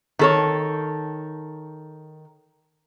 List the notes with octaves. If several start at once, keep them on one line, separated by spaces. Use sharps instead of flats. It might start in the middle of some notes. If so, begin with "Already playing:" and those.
D#3 A4 C#5